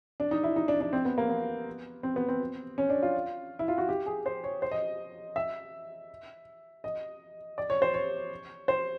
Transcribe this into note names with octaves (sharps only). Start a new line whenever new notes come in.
D4
D#4
E4
D#4
D4
D4
C4
B3
A#3
B3
C4
B3
C4
C#4
D4
F4
E4
F4
F#4
G4
G#4
C5
C#5
C5
D#5
E5
D#5
D5
C#5
C5
C#5
C5